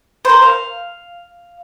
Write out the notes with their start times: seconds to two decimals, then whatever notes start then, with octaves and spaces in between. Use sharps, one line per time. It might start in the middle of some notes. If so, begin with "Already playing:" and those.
0.25 A#4 C5
0.42 F5